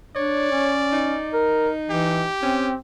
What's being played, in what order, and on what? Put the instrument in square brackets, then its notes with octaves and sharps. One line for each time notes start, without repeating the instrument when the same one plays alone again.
[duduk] D4 [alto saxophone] C#5 [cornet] D5
[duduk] C#4
[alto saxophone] D#4
[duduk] A#4
[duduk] E3 [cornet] G4
[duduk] C4 [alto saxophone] C#4